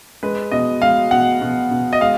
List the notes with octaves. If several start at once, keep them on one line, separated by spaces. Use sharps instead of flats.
G#3 B4
B2 D#5
G#3 F5
B2 F#5
B2
B2
D#5
G#3 F5